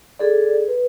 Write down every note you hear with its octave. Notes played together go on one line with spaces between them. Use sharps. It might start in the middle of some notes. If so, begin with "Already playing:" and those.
G#4 A4 D5
B4